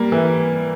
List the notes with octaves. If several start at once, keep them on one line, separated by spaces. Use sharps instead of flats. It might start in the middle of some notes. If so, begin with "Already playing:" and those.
Already playing: G3 A#3
E3